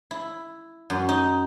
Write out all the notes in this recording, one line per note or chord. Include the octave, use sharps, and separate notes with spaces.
E4
F#2
D#4